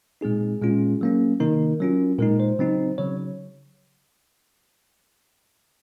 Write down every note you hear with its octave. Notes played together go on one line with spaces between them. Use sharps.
A#2 G#3 C4 D#4 G#4
A#2 G#3 C#4 F4
F#3 A#3 C#4
C3 D#3 A#3 D#4 A#4
F#3 C#4 F4
A#2 G#3 D#4 A#4
C5
C#3 F#3 C4 D#4
C#3 F#3 C#5